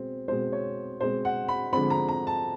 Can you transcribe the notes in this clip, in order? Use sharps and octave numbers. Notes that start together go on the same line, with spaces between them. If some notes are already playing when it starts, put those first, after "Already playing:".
Already playing: B2 G#3 C4
B2 G#3 C4 C5
C#5
B2 G#3 C4 C5
F#5
B5
D3 F3 G#3 C4 B5
A#5
A#5
A5